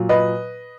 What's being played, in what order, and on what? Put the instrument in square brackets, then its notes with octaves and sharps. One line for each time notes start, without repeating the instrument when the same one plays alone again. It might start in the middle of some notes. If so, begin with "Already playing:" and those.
Already playing: [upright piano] A#2 F#3
B4 D#5